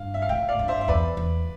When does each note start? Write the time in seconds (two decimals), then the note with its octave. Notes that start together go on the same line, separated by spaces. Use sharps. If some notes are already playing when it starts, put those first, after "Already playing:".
Already playing: G2 F5
0.14 E5
0.22 F5
0.29 A2 E5 G5
0.49 D5 F5
0.59 G2
0.68 C5 E5
0.81 E5
0.88 E2 B4 D5
1.17 E2